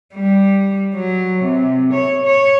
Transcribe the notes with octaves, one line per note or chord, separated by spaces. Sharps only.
G3
F#3
C3
C#5
C#5